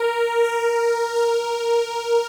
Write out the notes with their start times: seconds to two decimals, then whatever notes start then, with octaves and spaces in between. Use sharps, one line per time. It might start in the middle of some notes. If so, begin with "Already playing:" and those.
Already playing: A#4
0.44 A#4
1.16 A#4